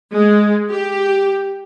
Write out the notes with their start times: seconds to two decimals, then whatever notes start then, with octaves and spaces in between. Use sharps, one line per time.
0.12 G#3
0.71 G4